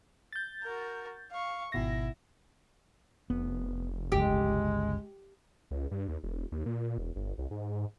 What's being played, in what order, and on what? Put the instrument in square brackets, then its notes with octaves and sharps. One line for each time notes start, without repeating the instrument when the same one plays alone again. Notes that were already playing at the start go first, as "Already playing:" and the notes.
[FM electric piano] G6 A6
[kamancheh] F#4 A#4
F5 C#6
[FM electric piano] G#1 B2 A#6 [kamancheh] E4
[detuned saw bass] F1 [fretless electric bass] B3
[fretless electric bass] G1 C#2 [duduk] G#3 [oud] G4
[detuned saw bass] C#2
G2
D#2
E1
D#2
A#2
E1
G1
C2
G#2